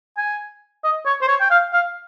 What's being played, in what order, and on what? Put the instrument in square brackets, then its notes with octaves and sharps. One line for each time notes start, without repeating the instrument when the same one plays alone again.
[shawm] G#5
D#5
C#5
C5
C#5
G5
F5
F5